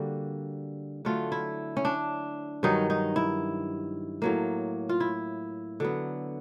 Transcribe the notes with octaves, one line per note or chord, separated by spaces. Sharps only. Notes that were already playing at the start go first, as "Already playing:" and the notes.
Already playing: D3 G3 A#3 F#4
D3 F#3 A3 F4
E4
C#4
D4
G2 D#3 F#3 D#4
D#4
E4
A2 F#3 A#3
F4
E4
D3 F#3 B3